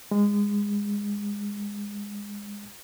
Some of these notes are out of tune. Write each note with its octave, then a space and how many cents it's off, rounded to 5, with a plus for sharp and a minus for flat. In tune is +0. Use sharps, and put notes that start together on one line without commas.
G#3 -20